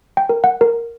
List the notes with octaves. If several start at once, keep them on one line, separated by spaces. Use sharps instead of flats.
G5
A#4
F#5
A#4